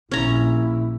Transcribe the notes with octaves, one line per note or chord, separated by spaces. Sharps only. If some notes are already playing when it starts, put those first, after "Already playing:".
A#1 A#2 A#3 C#4 E4 A#5